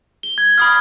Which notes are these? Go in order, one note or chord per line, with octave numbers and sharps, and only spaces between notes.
G7
G#6
B5 D#6 F6